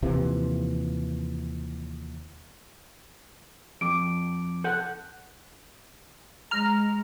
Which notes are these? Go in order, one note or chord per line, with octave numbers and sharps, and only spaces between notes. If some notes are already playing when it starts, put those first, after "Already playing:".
D#2 C3 E3 F3
F2 D6 D7
A4 F#5 F#6 G6
G#3 A#5 F6